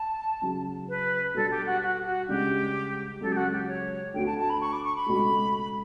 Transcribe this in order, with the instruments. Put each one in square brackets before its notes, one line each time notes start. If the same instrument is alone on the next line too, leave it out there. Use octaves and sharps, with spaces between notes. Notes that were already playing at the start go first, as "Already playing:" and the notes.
Already playing: [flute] A5
[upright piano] C#3 F#3 C#4
[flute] B4
[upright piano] B2 G3 D4 [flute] A4
[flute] G4
F#4
F#4
F#4
[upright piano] C#2 C#3 G3 D4 [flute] G4
[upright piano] C#2 C#3 F#3 [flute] A4
[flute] G4
F#4
G4
C#5
[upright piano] D2 D3 A3 [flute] G5
[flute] A5
A5
B5
C#6
D6
C#6
B5
[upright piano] C#2 B2 A3